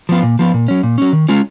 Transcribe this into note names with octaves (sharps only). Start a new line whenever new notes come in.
F3 B3 F4
A#2
F3 B3 F4
A#2
F#3 C#4
A#2
F#3 C#4
D#3
G#3 C#4 F4